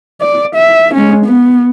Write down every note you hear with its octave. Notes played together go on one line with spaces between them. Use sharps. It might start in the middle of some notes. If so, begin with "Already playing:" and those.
D5
E5
G#3 C#4
B3